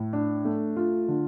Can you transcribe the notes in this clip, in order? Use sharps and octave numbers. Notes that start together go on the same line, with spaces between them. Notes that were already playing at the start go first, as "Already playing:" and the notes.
Already playing: A2
D4
A3
F4
D3